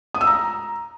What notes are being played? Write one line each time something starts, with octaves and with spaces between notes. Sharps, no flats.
D#6
E6
A#5